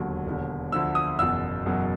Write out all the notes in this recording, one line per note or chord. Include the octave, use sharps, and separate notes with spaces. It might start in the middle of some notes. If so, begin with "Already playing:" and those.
Already playing: E1 D#2 D3 F#3
E1 D#2 D3
D2 D3 F3 E6
D#6
F#1 E2 B2 E6
F#1 E2 B2 F#3